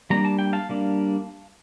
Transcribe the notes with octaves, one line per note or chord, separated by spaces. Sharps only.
G3 A#3 D4 A#5
A5
G5
F5 A5
G3 A#3 D4